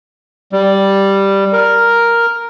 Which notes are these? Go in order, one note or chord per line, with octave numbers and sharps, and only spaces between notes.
G3
A#4